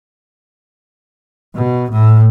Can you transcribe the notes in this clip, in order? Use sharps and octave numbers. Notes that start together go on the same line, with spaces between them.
B2
A2